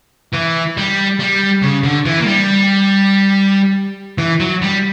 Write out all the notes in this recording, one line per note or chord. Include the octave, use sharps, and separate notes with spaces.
E3
G3
G3
C#3
D3
E3
A#3
G3
E3
F#3
G3